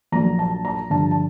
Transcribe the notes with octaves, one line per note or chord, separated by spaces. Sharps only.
A#1 A#2 F#3 A#5
A5
A#5
G2 D3 F3 A5
A5